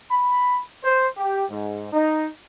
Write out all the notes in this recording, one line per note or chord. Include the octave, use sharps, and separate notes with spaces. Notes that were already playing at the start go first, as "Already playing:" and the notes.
B5
C5
G4
G#2
D#4